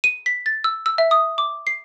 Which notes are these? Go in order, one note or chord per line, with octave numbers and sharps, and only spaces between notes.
D#7
B6
A6
E6
E6
E5
D#6
D6
C7